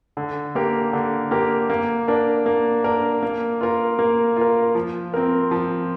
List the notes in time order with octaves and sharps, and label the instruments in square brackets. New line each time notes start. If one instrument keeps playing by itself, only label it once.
[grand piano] D3
A#3 G4 A#4
D3
A#3 G4 A#4
A#3
D4 A#4
A#3
D4 A#4
A#3
F4 A#4
A#3
F4 A#4
F3
C4 A#4
F3